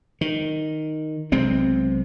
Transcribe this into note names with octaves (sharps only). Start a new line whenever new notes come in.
D#3
B1 C3 G#3 C4